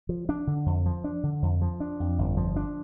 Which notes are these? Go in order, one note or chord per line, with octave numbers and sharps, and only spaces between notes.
F3
D4
D3
F2
F3
D4
D3
F2
F3
D4
F2
G1
F3
D4